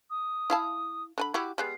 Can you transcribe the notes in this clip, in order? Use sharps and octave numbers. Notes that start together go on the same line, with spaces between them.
D#6
E4 F5 A5
D3 G#5 B5
E4 F#4 G4 D6
G3 G#3 B3 C7